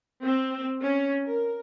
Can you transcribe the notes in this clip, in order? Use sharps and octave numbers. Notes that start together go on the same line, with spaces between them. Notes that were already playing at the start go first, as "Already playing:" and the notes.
C4
C#4
A#4